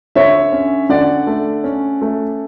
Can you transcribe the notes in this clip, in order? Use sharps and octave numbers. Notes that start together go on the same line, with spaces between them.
D3 C#5 E5
C#4
D3 D5 F#5
A3
C#4
A3